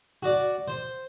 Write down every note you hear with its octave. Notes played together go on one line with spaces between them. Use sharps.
F#4 D5
C5